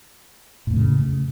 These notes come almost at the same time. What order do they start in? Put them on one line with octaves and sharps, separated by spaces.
A2 F2 A3 C#3